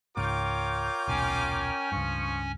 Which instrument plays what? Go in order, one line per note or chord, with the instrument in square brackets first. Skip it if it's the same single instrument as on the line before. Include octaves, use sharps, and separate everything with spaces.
[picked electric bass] C#2 G#2 [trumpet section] F4 D6 [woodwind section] A#4 C#5 G5
[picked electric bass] D#1 B1 [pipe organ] C#4 G#5
[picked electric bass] C#2 G2 [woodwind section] F3 C#6